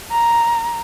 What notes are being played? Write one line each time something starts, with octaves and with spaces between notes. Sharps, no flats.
A#5